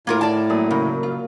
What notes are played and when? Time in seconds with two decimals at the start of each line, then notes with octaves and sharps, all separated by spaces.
0.07 A2 A#3 F4 A#4
0.21 D5 A5
0.50 F#2 A#2 D#6
0.71 C#3
1.03 F4